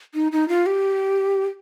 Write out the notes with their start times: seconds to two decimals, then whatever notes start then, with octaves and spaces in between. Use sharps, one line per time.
0.14 D#4
0.32 D#4
0.48 F4
0.66 G4